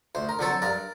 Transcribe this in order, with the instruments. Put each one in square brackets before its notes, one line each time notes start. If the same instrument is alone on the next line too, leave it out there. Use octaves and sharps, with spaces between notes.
[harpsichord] D2 C5
A#4
D3 F#3 C4 A4 C5
G2 A#4 D5